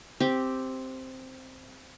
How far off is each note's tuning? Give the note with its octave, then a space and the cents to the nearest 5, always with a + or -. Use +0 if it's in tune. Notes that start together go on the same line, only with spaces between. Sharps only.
C4 +0 G4 +0